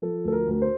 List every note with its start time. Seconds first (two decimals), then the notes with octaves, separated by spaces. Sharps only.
0.02 F3 A4
0.24 D2 A4
0.32 A#4
0.47 D2 A#4
0.62 C5